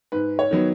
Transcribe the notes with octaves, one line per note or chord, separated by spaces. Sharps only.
G#2 B4
C#5
D#3 F#3 B3